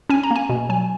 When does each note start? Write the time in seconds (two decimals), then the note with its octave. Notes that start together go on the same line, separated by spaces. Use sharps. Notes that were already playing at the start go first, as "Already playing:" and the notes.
0.10 C#4 G#5
0.23 A#5
0.31 A#3
0.36 G#5
0.49 B2
0.69 F#3 G#5